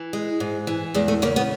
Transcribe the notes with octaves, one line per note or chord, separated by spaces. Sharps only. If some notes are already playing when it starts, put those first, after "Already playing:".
Already playing: E3
G#3
G#2
E3
E2 G#3
A3
C#3 A#3
B3